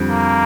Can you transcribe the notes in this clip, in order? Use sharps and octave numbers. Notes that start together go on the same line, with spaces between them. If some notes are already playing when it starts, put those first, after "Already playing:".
Already playing: F2 D3 G3
A#3